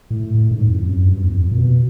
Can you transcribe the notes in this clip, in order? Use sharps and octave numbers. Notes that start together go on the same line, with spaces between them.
A2
A2
G#2
F2
F#2
G2
E2
F2
A#2
B2